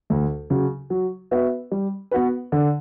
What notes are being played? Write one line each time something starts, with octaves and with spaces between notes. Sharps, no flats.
D2
C#3 F#3
F#3
B3 F#4 B4 E5
G3
B3 F#4 B4
D3